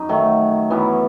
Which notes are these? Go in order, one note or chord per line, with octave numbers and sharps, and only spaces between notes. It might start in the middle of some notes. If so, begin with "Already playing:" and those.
Already playing: F#2 D#4
D#3 F#3 A3
F#2 E3 B3